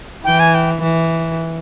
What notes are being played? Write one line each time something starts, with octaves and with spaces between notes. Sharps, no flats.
E3 G5
G#5
G5
E3